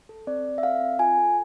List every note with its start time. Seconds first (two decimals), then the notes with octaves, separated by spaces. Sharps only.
0.09 A4
0.27 C4 D5
0.45 C4
0.58 E5
0.63 A4 F5
0.81 C4
0.99 F4 G#5
1.17 A4